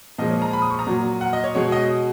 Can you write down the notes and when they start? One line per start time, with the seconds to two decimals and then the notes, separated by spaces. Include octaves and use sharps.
0.18 A#2 F3 G#3 D#5
0.30 C#5
0.42 A#5
0.53 B5
0.62 D#6
0.70 C#6
0.79 A#5
0.87 A#2 F#3
1.21 F#5
1.33 D#5
1.44 C#5
1.55 B2 G#3 C#5
1.72 D#5